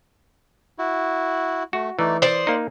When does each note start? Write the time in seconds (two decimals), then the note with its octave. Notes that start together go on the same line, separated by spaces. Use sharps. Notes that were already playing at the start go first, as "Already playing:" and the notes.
0.79 E4 F#4
1.73 A3 F#4
1.99 E3 A3 D#4 D5
2.22 C5 D5 D#6
2.47 A#3 D#4